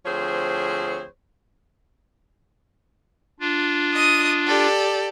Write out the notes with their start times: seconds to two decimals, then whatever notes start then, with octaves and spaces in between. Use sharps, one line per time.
0.06 D2 F3 C4 G#4 C5 C#5
3.40 D4 F4
3.93 D#5 D#6
4.46 G4 A4 D5